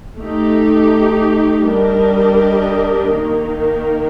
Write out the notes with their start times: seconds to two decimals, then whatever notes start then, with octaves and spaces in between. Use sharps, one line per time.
0.19 A3 D#4 G4
1.65 G3 D4 G4 A#4 D#5
3.12 D#3 A#3 D#4 A#4